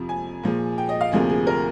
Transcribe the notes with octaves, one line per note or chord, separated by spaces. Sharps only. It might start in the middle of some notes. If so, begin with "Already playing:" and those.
Already playing: F2 C3 F3
G#5
A#2 F3 G#3
G5
D#5
F5
D2 C3 F3 A#3 G#4
G#4
A#4